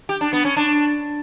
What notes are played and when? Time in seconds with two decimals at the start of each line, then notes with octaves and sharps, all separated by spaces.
0.09 G4
0.21 D4
0.33 B3
0.45 C#4
0.57 D4